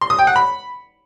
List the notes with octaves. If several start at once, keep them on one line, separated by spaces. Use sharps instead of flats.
C6
D#6
G5
F#5
B5